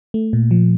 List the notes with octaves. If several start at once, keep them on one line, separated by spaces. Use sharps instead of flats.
A3
A#2
F3